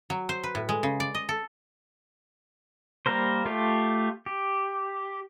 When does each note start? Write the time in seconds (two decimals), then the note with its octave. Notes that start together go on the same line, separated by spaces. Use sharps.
0.10 F#3
0.29 C5
0.44 B4
0.55 A2
0.69 G#3
0.83 C#3
1.00 D5
1.15 D#5
1.29 A4
3.06 G3 A#3 A#4 C5
3.46 A3 F4 G4
4.26 G4